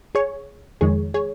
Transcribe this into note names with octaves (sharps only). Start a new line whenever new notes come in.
G#4 C#5
F2 D#3 G#3 G#4 C#5
G#4 C#5